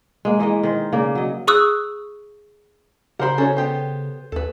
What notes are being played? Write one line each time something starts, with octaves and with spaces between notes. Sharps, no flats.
G#3 A#3
E3 G#3 A#4 D#5
D#3 C5
C#3 A#3 D5
F#3 D#5
G#4 C#6 D#6 E6 F#6
C#3 G4 A#4 C5 F#5 B5
C#4 F#4 A4 C#5
B3 G4 C5 G5
D#2 A4 B4